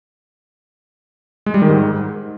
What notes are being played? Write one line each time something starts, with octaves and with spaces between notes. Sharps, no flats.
G#3
G3
D#3
G#2